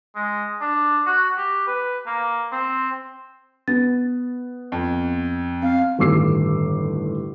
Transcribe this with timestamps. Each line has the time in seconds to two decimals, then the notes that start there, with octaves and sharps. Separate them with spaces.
0.15 G#3
0.61 D4
1.06 F#4
1.37 G4
1.67 B4
2.06 A#3
2.52 C4
3.68 B3 A6
4.72 F2
5.62 C4 F5
5.99 G1 D#2 A2 D6 E6 C7